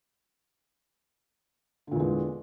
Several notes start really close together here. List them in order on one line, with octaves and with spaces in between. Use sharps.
D3 A#2 E2 G#3